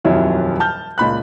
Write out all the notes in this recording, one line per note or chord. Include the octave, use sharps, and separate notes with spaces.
D#1 F2 F#3 E4 F4
A5 F6 G6
C#2 A#2 B5 F#6